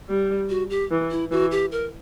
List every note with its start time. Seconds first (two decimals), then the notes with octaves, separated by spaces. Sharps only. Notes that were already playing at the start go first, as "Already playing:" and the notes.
0.09 G3
0.50 F#4
0.70 G4
0.91 E3
1.11 E4
1.31 E3 F#4
1.51 G4
1.72 A#4